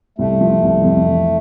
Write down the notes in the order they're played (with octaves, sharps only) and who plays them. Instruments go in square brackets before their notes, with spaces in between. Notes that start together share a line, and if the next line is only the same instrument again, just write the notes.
[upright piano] C2 [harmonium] A3
[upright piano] F3
C2
F2
E3